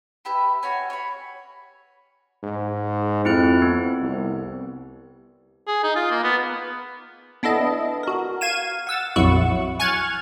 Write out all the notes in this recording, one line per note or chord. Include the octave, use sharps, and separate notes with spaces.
E4 G4 B4 E5
C#4 F#4 C#5 G#5
C#5 B5
G#2
F2 C4 E4 F#6
B3
C2
G#4
D#4
F4
A#3
B3
B3 D4 E4 A4 D#5
F#4 A#4
F5 G#6 D#7 E7
F#5 E6 A6
A#1 F2 F#3 E4 F#4 C#6
G#5 C#6 F6 F#6 G#6 A6